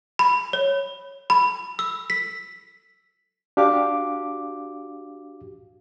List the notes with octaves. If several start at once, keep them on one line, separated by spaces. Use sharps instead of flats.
B5
C#5
B5
E6
B6
D4 F#4 G4 F5 D6